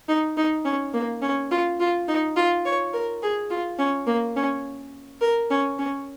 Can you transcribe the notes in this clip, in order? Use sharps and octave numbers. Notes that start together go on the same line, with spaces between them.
D#4
D#4
C#4
A#3
C#4
F4
F4
D#4
F4
C#5
A#4
G#4
F4
C#4
A#3
C#4
A#4
C#4
C#4